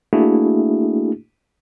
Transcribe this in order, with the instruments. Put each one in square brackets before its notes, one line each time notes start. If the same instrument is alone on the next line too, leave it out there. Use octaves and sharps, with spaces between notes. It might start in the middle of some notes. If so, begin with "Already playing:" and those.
[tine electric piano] A3 A#3 D4 E4 F#4 G#4